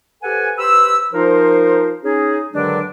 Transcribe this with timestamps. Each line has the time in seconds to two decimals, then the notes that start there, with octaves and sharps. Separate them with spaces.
0.23 G4 A4 B4 C5 F#5 G#5
0.58 G4 B4 C5 B5 E6
1.13 F3 D#4 A#4 C5
2.04 C#4 D#4 G#4
2.53 G2 D3 D#3 F#3 G#3 D4